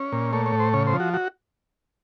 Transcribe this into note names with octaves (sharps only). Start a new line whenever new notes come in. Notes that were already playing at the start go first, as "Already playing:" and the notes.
Already playing: C#4
A#2
A3 C#5
C#5
A2
C5
C#3 C#5
C5
F3
F#4
F#4